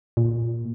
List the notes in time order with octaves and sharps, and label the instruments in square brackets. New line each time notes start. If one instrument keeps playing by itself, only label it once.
[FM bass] A#2